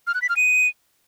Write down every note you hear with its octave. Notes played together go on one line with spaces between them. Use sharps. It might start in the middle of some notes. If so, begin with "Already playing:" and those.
F6
F#6
B6
F6
D#7